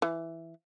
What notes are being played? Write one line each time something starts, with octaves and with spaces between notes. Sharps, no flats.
E3